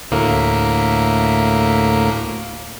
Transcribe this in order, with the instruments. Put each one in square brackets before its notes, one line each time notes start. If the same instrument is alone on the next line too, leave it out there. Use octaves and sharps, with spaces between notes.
[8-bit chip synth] D2 A2 A#3